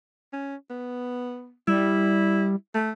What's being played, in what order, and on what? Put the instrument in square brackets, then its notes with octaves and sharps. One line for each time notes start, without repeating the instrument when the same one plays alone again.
[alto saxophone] C#4
B3
[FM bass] G3 [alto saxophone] E4
[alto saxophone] A3